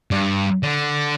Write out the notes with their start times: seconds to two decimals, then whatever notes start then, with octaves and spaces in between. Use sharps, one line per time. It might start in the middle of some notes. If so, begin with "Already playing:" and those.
0.11 G2
0.63 D3